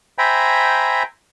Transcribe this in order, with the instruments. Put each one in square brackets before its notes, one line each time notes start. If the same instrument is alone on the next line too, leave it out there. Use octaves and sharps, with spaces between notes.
[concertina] C5 E5 G5 G#5 A#5 B5